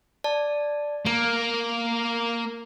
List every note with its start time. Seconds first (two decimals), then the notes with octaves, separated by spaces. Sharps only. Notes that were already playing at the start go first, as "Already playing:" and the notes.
0.24 D5 A5
1.07 A#3 D7